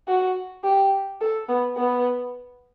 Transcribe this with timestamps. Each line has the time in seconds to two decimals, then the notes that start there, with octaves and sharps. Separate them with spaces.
0.08 F#4
0.64 G4
1.21 A4
1.49 B3
1.77 B3